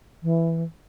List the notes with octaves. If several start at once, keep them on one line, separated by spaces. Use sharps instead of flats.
E3